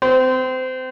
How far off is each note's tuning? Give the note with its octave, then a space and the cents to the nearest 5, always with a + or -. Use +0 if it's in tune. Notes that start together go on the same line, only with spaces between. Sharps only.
C4 -25